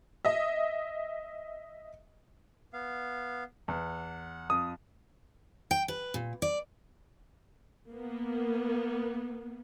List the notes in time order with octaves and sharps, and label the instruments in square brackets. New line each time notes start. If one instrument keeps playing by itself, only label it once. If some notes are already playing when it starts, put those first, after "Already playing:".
[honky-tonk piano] D#5 E5
[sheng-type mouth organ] B3 F5
[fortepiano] E2 [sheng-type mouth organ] F#5
[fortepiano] F2 [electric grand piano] D#6
[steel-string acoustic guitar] G5
B4
A#2
D5
[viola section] A#3 B3